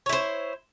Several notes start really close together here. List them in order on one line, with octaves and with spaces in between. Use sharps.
C#5 E4 C5